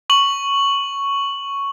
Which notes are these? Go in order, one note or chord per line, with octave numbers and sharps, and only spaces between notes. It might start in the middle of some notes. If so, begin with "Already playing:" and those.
C#6 F#7